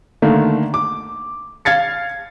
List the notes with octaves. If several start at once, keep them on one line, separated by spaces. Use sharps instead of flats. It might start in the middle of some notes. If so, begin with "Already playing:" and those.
D3 D#3 A3 A#3
D6
F5 G#6 A6 C#7